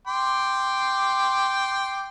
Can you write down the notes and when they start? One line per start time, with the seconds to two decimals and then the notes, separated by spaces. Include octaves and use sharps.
0.07 G5 C6 D6